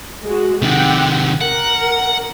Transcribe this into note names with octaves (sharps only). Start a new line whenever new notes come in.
G#3 F#4
C3 D#3 F#5 G5
A#4 F#5